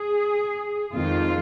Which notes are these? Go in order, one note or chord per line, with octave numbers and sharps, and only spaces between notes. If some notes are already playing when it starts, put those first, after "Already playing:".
Already playing: G#4
F2 D#3 G#3 C4 F4